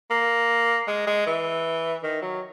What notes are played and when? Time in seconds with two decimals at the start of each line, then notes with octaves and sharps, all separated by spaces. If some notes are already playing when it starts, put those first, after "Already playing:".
0.10 A#3
0.87 G#3
1.07 G#3
1.26 E3
2.03 D#3
2.22 F#3